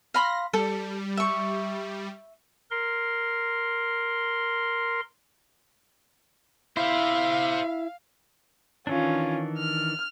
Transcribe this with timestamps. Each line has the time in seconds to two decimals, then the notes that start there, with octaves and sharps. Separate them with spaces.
0.14 F5 B5 C6 A#6
0.53 G3 A4
1.17 E5 C#6
2.71 A#4 C6
6.77 E4 C5 E5 F5
8.87 D#3 E3 C#4 D4 F4
9.57 F6